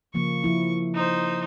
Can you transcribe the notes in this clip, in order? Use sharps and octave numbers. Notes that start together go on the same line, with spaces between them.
C#3 F3 A#3 C#6
F3 E4
D#4 C5